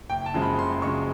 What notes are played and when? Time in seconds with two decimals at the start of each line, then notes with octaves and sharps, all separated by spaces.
0.10 F#1 G5
0.26 A5
0.34 F#2 C#3 F3 G#3
0.42 B5
0.58 F#1 C6
0.82 F#2 C#3 F3 G#3 C#6